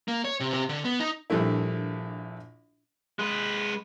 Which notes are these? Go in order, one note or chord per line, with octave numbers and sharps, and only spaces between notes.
A#3
C#5
C3
C3
D3
B3
D#4
A#1 G2 A3 E4
G#3 B4